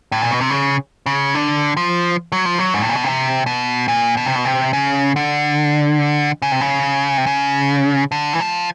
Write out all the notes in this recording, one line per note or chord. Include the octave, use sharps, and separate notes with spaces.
A2
A#2
B2
C3
C#3
C#3
D3
F3
F#3
F3
F#3
G#2
A2
A#2
B2
C3
B2
A#2
B2
C3
B2
C3
C#3
D3
C#3
C3
C#3
C3
C#3
D3
E3
F3